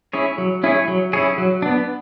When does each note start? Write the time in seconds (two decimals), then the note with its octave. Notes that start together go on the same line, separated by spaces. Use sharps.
0.13 C#4 E4 G#4 C#5
0.38 F#3
0.63 C#4 E4 G#4 C#5
0.88 F#3
1.13 C#4 E4 G#4 C#5
1.38 F#3
1.62 B3 D4